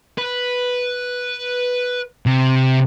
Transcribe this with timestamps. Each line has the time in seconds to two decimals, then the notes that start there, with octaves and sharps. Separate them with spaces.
0.18 B4
2.26 C3